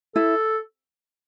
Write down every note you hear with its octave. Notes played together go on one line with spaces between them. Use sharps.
E4 A4